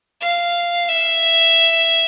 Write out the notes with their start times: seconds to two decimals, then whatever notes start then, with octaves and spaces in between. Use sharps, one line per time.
0.21 F5
0.89 E5